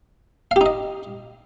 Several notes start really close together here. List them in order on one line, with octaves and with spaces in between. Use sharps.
F5 G4 D#4 D#5